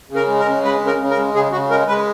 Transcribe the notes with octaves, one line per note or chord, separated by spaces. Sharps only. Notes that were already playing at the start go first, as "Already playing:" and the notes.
C#3
A#4
G#3
A#4
C#3
G#3 B4
C#3
A#4
C#3
A#4
G#3
C#3 G#4
C#3 F#4
G#3 A#4
G#3 B4